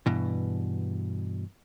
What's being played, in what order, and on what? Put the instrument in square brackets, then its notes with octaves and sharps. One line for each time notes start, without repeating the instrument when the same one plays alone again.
[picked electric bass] G2 B2 E3